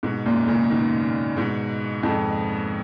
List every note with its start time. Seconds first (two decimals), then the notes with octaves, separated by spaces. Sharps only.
0.03 G#2 B2
0.26 F#2 A#2
0.47 A#2 C#3
0.70 B2 D#3
1.37 G#2 B2
2.03 F2 G#2